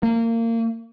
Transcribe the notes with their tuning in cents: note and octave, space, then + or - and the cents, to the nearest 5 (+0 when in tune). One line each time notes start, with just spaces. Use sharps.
A#3 -25